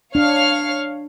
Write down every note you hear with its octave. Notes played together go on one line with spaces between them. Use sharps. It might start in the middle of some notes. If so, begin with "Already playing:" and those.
D4 C#5 F5 F6